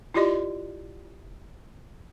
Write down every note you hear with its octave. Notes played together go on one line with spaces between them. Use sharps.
E4 F4 G4 D5 D#5